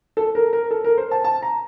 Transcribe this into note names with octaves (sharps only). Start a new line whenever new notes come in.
A4
A#4
A#4
A4
A#4
C5
A5
A5
A#5